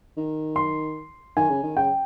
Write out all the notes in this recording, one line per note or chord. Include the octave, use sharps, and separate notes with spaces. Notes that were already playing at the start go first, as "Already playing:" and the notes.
D#3
C6
D#3 G#5
C#3
D#3
C#3 G5